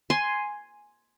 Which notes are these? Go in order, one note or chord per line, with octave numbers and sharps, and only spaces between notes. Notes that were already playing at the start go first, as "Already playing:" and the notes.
G#5 C6